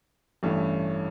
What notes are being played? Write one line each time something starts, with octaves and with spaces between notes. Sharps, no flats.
A1 G2 E3 A3 C#4